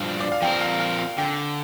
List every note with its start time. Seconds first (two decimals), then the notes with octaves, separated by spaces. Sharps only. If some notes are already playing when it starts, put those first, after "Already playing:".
Already playing: G2 F3 D4
0.20 D5
0.32 F5
0.42 F3 C4 A#4 G5
0.61 F5
0.80 F5
0.99 F5
1.18 D3 G5